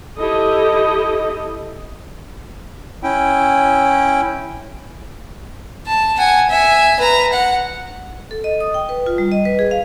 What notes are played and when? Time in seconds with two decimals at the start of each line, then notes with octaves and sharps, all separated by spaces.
0.18 E4 G4 A4 D#5
3.03 C#4 E4 G5
5.87 A5
6.18 F#5 G#5
6.50 E5 G#5
6.99 B4 A#5
7.33 F#5
8.31 A4
8.44 D#5
8.61 D#6
8.74 G5
8.89 B4
9.06 F4
9.18 G3
9.32 D#5
9.45 B4
9.59 G#4
9.71 F5